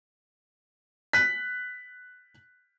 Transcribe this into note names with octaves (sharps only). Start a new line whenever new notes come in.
F#6 B6